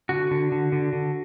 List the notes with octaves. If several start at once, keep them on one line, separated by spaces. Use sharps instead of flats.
D3 F#4
D3
D3
D3
D3